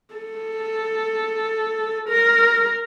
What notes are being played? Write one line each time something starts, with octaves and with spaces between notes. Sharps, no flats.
A4
A#4